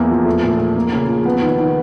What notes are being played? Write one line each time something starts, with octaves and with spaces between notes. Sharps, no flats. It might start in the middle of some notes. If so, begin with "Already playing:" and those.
Already playing: E2 A#3
F3
A3
A#2
A#2
A#3
C#3
F3
B3
D#3
D#3